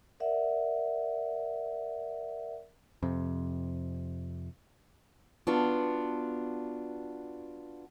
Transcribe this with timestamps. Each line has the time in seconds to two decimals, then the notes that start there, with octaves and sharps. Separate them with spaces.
0.20 A#4 D5 E5 F#5
3.03 F2 C3
5.47 B3 D4 F4 F#4